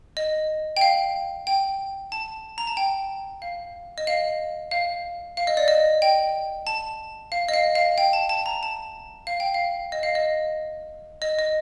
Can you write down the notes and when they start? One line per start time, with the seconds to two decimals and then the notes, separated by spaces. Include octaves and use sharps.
0.17 D#5
0.77 G5
0.81 F5
1.47 G5
2.12 A5
2.58 A#5
2.67 A5
2.77 G5
3.42 F5
3.98 D#5
4.07 F5
4.71 F5
5.37 F5
5.47 D#5
5.57 D5
5.68 D#5
6.02 G5
6.67 A5
7.32 F5
7.49 D#5
7.53 F5
7.75 F5
7.98 G5
8.13 A5
8.29 A5
8.46 A#5
8.63 A5
9.27 F5
9.40 G5
9.54 F5
9.92 D#5
10.03 F5
10.15 D#5
11.22 D#5
11.39 D#5